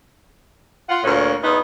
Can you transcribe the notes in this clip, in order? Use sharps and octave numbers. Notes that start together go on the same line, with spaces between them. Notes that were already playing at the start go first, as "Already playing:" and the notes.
F4 F#5
D2 A#2 C#5 F5
E2 B3 D#4